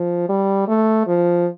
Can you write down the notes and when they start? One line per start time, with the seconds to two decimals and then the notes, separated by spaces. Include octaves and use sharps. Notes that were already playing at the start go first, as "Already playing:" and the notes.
Already playing: F3
0.29 G3
0.68 A3
1.07 F3